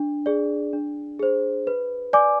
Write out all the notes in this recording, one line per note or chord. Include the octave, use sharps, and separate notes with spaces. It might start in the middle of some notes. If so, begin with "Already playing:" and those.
Already playing: D4
G#4 D5
D4
G#4 C5
B4
D5 G#5 D6